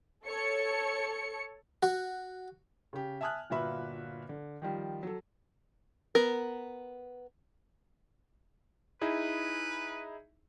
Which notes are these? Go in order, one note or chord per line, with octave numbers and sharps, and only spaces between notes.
A4 C#5 C#7
F#4
C#3 G4
E5 G#5 A5 D#6 F6 F#6
G1 A#2 F#4 B4 E5 B5
D3
D#3 F3 G3
F#3 A4
B3 A#4
D#4 E4 G#4 B4